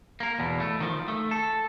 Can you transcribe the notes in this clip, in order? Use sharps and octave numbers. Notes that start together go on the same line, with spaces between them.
A#3 A#4
E2 B2
A3
D#3 F3
A3
A4